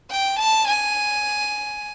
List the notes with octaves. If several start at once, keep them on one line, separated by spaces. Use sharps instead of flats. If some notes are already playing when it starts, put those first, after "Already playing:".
G5
A5
G#5